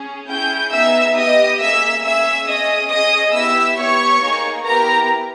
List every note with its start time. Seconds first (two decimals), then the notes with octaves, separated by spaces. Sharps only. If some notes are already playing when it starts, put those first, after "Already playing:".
Already playing: C#4 G#4
0.29 C#4 E4 G#4 G5 G6
0.72 B3 D#4 G#4 E5 E6
1.16 B3 G4 D#5 D#6
1.60 A#3 C#4 G#4 E5 E6
2.03 C#4 G#4 E5 E6
2.47 C#4 G#4 D#5 D#6
2.90 C#4 G#4 D#5 D#6
3.33 B3 E4 G4 E5 E6
3.77 B3 E4 G4 C#5 C#6
4.20 A#3 D#4 G#4
4.64 B3 E4 G4 A#4 A#5